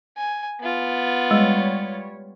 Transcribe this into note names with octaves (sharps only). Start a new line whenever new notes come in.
G#5
B3 F4
G3 G#3 C#5